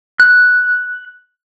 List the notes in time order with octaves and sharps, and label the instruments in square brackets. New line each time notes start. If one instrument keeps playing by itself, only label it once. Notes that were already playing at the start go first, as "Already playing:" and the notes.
[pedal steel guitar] F#6